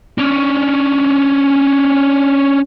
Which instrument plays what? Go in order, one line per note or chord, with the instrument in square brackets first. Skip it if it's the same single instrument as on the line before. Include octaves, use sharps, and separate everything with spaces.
[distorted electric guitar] C#4 D4